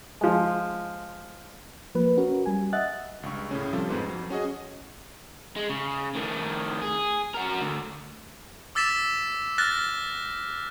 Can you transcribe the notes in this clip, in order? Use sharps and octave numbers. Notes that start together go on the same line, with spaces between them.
F3 G#3
F3 A#3 B4
C#4 F#4 A#4
G3 G#5
D#5 E5 F#5 F#6 A6
C#2 G2 C#6
A2 C#3 C#4
C3 F3 G3 F4 A4
F2 G#2 B3
F2 F#3
C#4 F#4 G#4 D#5
G#3
C#3
A2 D#3
G#4
F#4 A#4
D2
D6 E6 A6 B6 E7
F6 F#6 A6 A#6